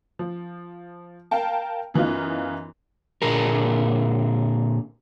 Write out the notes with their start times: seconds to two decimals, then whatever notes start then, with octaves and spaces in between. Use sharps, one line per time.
0.19 F3
1.31 A#4 F5 G5 A5
1.94 F#2 E3 B3 D#4 F4
3.22 A#2 D3 G#4 A#4